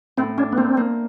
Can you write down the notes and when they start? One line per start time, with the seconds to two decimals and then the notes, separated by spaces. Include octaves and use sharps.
0.18 A2 C4
0.38 C#4 D4
0.53 B3
0.57 A#3 C4
0.77 A#3